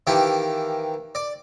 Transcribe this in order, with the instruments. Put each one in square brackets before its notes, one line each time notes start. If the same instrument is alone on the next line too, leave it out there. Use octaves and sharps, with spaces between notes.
[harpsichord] D#3 E3 A#3 G4
D5